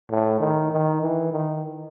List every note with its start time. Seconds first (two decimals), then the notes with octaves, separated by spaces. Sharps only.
0.10 A2
0.40 D#3
0.72 D#3
1.01 E3
1.32 D#3